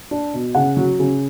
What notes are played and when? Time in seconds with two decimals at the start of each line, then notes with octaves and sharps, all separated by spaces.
0.11 D4
0.33 B2
0.55 C#3 F#5
0.77 F#3
0.99 C#3